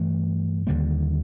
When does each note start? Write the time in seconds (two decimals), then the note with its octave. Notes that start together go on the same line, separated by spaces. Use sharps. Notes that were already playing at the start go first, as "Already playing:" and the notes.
Already playing: G2 E3 A3
0.67 D#2 D3 G3 A#3